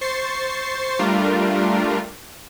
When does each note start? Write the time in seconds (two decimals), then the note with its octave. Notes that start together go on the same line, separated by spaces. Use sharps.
0.01 C5 C#6 A6 C7
0.99 G3 A3 D4 F4 A#4